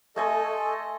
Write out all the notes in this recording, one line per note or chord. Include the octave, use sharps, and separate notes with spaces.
A3 A4 D#5 G#5 C6